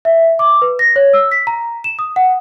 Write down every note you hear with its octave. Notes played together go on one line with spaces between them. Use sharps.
E5
D6
B4
A#6
C#5
E6
B6
A#5
E7
D#6
F#5